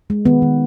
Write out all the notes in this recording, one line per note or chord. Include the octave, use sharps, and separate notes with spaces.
G#3
D#3 B3
D#3